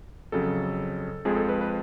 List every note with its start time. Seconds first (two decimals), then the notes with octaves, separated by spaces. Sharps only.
0.32 F2 C#3 F#3 A4
1.25 F2 F3 G#3 G#4
1.36 A4
1.49 B4
1.61 B4